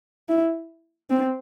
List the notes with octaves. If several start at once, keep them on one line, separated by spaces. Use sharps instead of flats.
E4
C4